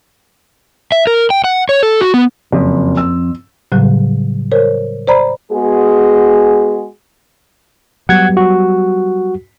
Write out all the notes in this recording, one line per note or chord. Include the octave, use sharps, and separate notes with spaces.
E5
A#4
G5
F#5
C#5
A4
F#4
B3
F#1 F2
E6
A2 C#3 F#3 G3
A#4 C5 C#5
C5 D5 A#5 B5
G#3 B3 F#4 G#4
F#3 G3 B3 F#5 G#6
F#4